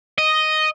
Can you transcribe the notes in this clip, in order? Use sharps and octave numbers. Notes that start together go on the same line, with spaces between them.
D#5